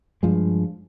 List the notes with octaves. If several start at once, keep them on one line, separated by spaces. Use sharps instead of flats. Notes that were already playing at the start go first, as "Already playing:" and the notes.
G2 F3 G#3